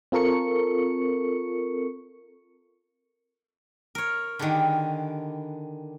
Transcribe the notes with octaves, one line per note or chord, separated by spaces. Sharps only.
C4 F4 A4 A#4 C#6 C#7
A#4 C#5
D3 D#3 G4 G#4 B4